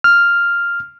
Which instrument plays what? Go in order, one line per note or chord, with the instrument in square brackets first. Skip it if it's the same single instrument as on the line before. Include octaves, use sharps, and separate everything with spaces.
[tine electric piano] F6